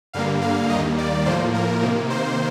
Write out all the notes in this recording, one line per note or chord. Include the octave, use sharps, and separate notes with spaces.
G2 D3 G3 A#3 F5
F5
D#2 D#3 G3 A#3 D#5
D5
A2 F3 A#3 C5
A#4
C3 D#3 A#3
C5